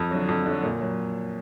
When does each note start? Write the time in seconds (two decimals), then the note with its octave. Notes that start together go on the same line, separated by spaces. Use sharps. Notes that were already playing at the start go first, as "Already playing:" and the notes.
Already playing: F2
0.11 D3 F#3
0.29 F2
0.46 D3 F#3
0.63 A#2
0.81 F#3